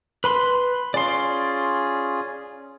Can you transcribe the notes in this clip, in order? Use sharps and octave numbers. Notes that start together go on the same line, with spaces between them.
B4 B5 C6
C#4 F4 G#4 D5 C6